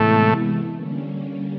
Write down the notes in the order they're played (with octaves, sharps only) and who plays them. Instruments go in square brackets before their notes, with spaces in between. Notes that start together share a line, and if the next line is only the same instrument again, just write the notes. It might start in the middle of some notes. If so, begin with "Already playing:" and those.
Already playing: [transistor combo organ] A2 A3 [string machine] C3 E3 G#3 B3 E4
[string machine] D3 G3 A#3 C#4